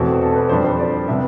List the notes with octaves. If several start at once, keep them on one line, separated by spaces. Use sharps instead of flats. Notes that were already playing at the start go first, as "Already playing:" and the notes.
Already playing: E2 B2 A3 C4
A4
B4
F2 D3 G3 C5
C5
D5
C3 G3 B3 E5